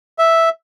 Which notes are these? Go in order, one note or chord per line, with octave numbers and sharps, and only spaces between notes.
E5